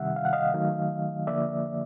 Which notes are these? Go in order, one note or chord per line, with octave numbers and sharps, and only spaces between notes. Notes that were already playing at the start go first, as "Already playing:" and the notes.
Already playing: C3 D#3 G3 E5 F#5
F5
F#5
D#5 F5
D#3 F#3 A3
D3 F3 A#3 D5 E5